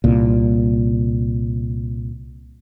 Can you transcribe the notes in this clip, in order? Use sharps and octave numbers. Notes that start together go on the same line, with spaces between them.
C2 A#2